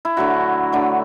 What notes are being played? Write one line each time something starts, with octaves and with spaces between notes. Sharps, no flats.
E4
D3 F#3 A3 F#4
D3 F#3 A3